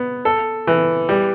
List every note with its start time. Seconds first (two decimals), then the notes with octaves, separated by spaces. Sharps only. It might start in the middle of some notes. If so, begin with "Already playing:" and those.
Already playing: B3
0.25 A4
0.67 E3
1.09 G3